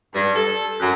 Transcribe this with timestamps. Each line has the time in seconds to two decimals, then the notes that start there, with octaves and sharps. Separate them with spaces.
0.14 G2
0.34 A4
0.80 F#2